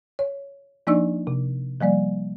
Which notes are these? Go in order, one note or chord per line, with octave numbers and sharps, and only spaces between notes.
C#5
F3 A#3 D4 D#4 D5 E6
C3
F3 G3 A#3 D5